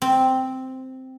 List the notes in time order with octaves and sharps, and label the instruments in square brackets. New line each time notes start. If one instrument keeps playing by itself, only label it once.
[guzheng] C4